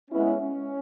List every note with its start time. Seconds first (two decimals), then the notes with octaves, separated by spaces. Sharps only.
0.10 G#3 B3 C#4 E4
0.41 C#4